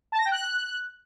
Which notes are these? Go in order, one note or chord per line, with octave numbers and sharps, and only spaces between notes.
A5
A#6
G5
F#6